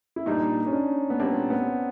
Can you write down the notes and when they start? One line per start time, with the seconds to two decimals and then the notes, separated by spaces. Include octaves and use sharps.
0.16 E4
0.26 A#2 G3 A#3 D4 D#4
0.67 C#4
0.73 D4
1.10 B3
1.20 A#2 G3 A#3 C4 D4
1.50 B3